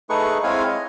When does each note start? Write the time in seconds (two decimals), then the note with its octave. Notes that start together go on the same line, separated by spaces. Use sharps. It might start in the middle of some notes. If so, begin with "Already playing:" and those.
0.10 A3 D#4 G#4 B4 C#6
0.44 G#3 C4 E4 C#5 F5 G#5
0.68 D#5